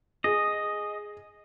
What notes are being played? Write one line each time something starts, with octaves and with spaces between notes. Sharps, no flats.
G#4 D#5